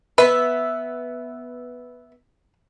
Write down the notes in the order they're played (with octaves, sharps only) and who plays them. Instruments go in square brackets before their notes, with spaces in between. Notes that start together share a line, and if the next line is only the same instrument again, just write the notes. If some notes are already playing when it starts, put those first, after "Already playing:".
[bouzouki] B3 E5 [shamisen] B4